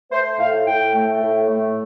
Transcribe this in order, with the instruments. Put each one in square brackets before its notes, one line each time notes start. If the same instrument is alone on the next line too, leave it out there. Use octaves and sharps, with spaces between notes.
[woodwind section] A3 C5
A2 F5
A2 G5
A3
A2
A3